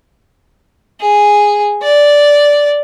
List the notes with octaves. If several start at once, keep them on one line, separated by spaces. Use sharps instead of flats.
G#4
D5